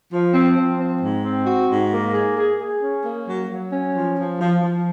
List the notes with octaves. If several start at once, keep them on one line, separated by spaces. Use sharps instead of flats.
F3
C4
F3
C4
G#2
C4
F#4
G#2
A#3
G#4
G#4
G#4
C#4
A#3
F#3
F#3
C#4
F3
F3
F3
F3